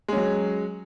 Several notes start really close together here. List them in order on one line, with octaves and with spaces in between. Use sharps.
G#3 C#4 F#3